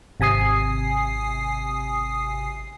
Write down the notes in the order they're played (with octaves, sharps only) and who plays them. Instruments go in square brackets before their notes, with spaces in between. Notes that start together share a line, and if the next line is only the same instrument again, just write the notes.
[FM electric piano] G#1 C3 G#5 D#6 C7